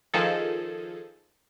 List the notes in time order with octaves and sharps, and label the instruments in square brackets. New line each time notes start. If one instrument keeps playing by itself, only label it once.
[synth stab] D#3 F3 G#4 A4